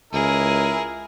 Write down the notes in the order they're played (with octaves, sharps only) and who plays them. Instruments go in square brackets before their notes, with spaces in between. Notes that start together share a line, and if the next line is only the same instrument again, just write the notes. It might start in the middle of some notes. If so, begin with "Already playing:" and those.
[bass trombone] C#2 [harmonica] E4 A#4 [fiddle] G#4